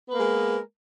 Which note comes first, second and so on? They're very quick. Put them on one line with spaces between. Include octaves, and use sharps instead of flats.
B3 B4 A#3 G#3 A#4